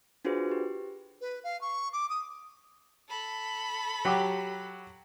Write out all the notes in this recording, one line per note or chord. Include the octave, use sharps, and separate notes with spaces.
D4 F4 F#4 G#4 B4 C5
G4
B4
F5
C#6
D6
D#6
A4 B5
F#3 G4 D6